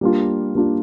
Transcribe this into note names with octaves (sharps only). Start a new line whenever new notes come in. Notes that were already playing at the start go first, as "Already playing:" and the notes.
G3 A#3 D4 F4
G3 A#3 D4 F4